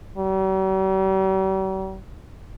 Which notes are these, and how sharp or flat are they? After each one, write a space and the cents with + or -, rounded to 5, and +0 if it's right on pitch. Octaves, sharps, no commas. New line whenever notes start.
G3 -45